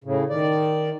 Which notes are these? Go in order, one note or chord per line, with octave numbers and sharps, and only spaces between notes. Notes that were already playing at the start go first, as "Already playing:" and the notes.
A2 C#3
D#3 D5